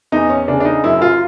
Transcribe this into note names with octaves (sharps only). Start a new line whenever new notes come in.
E2 D#4
C#4
C#3 D4
D4
D#4
F#2 E4
F4